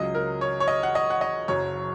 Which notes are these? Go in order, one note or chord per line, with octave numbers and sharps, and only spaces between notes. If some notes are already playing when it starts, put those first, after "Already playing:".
Already playing: C#2 C#3 F#3 D#5
A#4
C#5
C#5
D#5
F#5
D#5
F#5
D#5
F#1 F#2 F#3 C#5